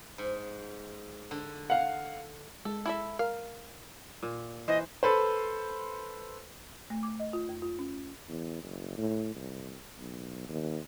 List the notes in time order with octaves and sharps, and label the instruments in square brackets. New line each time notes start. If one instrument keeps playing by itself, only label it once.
[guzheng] G#2
D3
[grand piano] F5 F#5
[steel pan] G#3 [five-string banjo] A4
[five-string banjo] E4 A4 E5
[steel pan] A#4 [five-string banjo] F5
[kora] A#2
[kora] E3 C5 [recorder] D#5
[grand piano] A4 B4 C5
[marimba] A3
D6
D#5
F4
F2
F4
C#4
[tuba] E2
F#1
A2
C2
B1
D#2